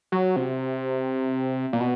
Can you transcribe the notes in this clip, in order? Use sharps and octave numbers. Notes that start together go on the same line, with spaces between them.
F#3
C3
A#2
B2